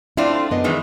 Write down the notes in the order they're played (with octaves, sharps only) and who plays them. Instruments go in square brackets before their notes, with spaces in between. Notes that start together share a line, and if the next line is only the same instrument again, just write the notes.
[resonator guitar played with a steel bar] A3 C4 F4 [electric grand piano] D4 D5 [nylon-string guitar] E4
[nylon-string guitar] F#2 B3 D#5
[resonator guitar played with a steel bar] D#3 E3 G#3